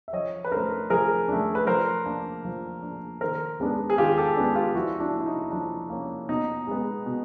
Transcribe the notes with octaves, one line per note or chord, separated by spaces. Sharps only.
E5
F3 C#5 D#5
B4
A3 D4 A#4 C5
F3 G#4 A#4
A3 D4
B4
F3 A#4 C5
A#3 D4
F3
A#3 D4
D#3 A#4 C5
G#3 B3 D4
G#4
D#3 F4 G4
G4 A4
G#3 B3 D4
F4 G4
F3 E4 F#4
D4 E4
A#3 C#4
E4
D#4
F3 D4
A#3 C#4
B2 D#4
G#3 B3
B2